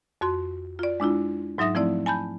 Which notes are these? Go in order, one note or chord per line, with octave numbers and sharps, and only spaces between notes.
F2 F#4 C6
F4 D5
G#3 D4 E4 F4
G#2 F#3 D#4 E5 D#6 A#6
F3 A3 C4 E4 D5
G#5 A5 B5 G6